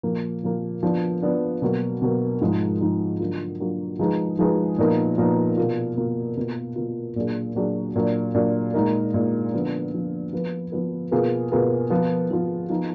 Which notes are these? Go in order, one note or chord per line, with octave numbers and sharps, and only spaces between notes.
A#2 F3 A#3
A#2 F3 A#3
F3 B3 D4
F3 B3 D4
B2 F#3 A#3
B2 F#3 A#3
G#2 F3 G#3 D#4
G#2 F3 G#3 D#4
D3 F#3 A#3 F4
D3 F#3 A#3 F4
F3 G#3 D#4 G#4 B4
F3 G#3 D#4 G#4 B4
A#2 F3 B3 D#4 A#4
A#2 F3 B3 D#4 A#4
B2 A#3 F4
B2 A#3 F4
B2 A#3 F4
B2 A#3 F4
A#2 F#3 D4 G#4
A#2 F#3 D4 G#4
A#2 F#3 D4
A#2 F#3 D4
A#2 G#3 D#4 A#4
A#2 G#3 D#4 A#4
D3 F3 B3 F4
D3 F3 B3 F4
F3 B3 F4 B4
F3 B3 F4 B4
B2 A#3 F4 G#4 B4
B2 A#3 F4 G#4 B4
F3 B3 F4
F3 B3 F4
F3 B3 D#4